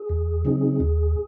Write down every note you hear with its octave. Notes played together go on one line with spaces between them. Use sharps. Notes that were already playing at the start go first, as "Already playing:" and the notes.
Already playing: G#4
E2
C#3 F#3 C4 D#4
D#2